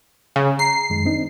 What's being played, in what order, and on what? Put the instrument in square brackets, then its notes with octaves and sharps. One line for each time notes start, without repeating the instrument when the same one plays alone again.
[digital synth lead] C#3
[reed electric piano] A#5 [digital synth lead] C7
[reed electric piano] F#2 D#3 G#3
C4 D4 D#4